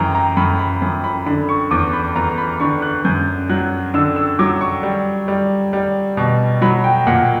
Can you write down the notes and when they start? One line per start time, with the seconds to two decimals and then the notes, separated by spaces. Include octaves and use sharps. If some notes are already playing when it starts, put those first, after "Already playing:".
Already playing: F#2 E3 G5 A#5
0.15 A#5
0.37 F#2 B5
0.59 B5
0.82 F#2
1.04 B5
1.26 D3 B5
1.49 C#6
1.71 E2 D6
1.93 B5
2.15 E2 A#5
2.38 B5
2.60 D3 C#6
2.82 F#6
3.05 F#2 G6
3.49 F#3 F#6
3.94 D3 E6
4.16 E6
4.39 F#3 D6
4.61 C#6
4.83 G3
5.28 G3
5.73 G3
6.17 B2
6.62 F#3 B5
6.84 G5
7.07 A#2 F#5